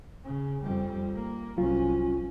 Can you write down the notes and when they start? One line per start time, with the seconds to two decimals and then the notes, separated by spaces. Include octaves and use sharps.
0.24 C#3
0.63 F2 G3
1.15 A#3
1.58 C2 F#3 C#4 F4